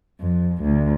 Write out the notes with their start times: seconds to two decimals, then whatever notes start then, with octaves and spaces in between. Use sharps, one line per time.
0.20 F2
0.62 D2